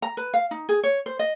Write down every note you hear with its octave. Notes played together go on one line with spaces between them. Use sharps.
A#5
B4
F5
D#4
G#4
C#5
C5
D#5